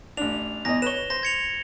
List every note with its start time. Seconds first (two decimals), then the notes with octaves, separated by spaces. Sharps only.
0.17 A1 D4 F7
0.65 E2 D#5 A#6
0.82 B4 C#5 E7 G7
1.10 C5 A#6
1.23 G#6 C#7 F7